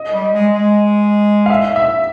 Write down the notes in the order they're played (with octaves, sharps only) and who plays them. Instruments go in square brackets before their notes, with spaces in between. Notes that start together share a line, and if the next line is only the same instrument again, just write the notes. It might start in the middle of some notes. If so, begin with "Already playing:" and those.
Already playing: [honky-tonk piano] D#5
[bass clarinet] G3
G#3
G#3
[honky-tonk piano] F5
E5
E5